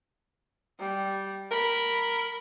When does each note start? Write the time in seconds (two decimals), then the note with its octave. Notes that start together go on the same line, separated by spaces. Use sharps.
0.79 G3
1.51 A#4 B5